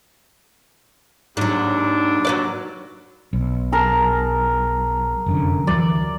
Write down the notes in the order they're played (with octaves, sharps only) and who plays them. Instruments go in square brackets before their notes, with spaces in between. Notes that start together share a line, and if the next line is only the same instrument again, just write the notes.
[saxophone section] D#2 D4 [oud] G#2 F#3
[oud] F#3 B4 D5
[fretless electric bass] B1
[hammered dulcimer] G#4 A#4 A5
[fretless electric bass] F1 F#2 D3
[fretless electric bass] D2 E3 F#3 [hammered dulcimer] D5